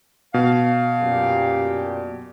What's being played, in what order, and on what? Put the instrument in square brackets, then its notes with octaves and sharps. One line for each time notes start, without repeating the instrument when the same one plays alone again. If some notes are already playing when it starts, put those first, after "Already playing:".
[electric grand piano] B2 [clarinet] F5
[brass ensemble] F#2 A#2 G4